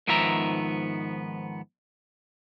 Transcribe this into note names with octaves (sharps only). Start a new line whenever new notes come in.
G#2 D#3 F3 B3 E5 A#5